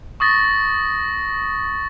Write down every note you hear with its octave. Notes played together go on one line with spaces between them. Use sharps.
C#6 D#6 A6 A#6